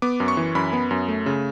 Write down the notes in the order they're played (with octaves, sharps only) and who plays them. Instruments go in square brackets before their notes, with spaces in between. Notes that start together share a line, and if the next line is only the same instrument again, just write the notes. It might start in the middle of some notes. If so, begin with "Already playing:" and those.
[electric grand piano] B3 D6
F#2
C#6
E3
F#2 B5
B3
F#2
A3
C#3